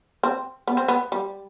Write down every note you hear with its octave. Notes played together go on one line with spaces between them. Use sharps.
C4
B3
C4
B3
G3